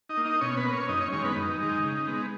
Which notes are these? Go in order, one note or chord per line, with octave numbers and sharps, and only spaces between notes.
D#4 D#5
A#3
D#4 D#5
B2 C#4 C#5
B3 B4
A#3
C#4 C#5
F#2 D#4 D#5
C#4 C#5
D#3 G#3 C#4 C#5
B3 B4
F#2 D#4
D#3 G#3
C#3
G#3 B3